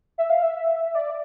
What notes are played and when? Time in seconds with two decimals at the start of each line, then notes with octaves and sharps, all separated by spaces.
0.18 E5
0.30 F5
0.42 E5
0.95 D5